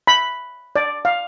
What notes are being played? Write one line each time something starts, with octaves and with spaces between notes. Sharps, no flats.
B5
D5
F5